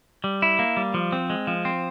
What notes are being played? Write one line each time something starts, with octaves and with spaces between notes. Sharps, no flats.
G3
E4
A#3
G3
F3
C4
G#3
F3
C4